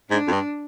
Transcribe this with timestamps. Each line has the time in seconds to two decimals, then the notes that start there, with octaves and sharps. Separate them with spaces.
0.10 G#2 D4
0.27 F2
0.32 G2